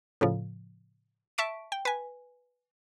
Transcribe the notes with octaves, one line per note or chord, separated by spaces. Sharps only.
A2 C#3 F3
E5 A5 C#6 B6 D7
G5
B4 G#5